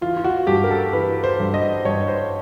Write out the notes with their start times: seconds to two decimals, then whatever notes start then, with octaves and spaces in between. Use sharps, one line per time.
0.01 E3 F4
0.17 F4
0.24 F#4
0.47 G2 G4
0.64 A#4
0.71 A4
0.93 E3 B4
1.24 C5
1.40 G2
1.54 D#5
1.85 G2 C#5
2.08 C5